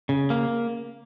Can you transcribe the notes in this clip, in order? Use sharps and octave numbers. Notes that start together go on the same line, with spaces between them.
C#3
A#3